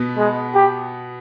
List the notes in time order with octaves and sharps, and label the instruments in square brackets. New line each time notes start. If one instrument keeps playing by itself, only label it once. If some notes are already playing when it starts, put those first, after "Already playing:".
Already playing: [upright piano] B2 B3
[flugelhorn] G#3
G4